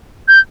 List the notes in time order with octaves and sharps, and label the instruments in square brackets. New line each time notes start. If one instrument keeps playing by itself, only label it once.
[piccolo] G6